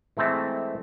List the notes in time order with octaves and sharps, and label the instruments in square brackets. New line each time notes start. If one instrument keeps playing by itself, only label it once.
[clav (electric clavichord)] E3 G#3 A3 C4 E5